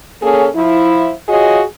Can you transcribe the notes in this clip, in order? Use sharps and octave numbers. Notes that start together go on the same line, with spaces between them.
A#3 C#4 G#4 A4 C#5
F3 E4
F4 F#4 G#4 C#5 D#5